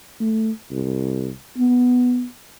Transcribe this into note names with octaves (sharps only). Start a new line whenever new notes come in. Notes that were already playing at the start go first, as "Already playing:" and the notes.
A3
C2
B3